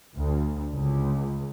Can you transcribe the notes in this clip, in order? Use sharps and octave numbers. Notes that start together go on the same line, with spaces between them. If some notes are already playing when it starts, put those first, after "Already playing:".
D2
C#2